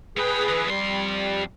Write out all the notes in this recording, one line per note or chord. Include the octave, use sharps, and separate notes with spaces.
A2 G#4 B4 G5
D3 E3
F2 G3 C6